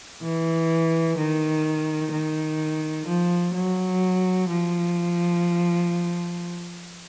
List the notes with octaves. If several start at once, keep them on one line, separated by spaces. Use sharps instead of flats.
E3
D#3
D#3
F3
F#3
F3